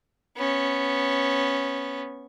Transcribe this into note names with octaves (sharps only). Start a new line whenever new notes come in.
B3 C#4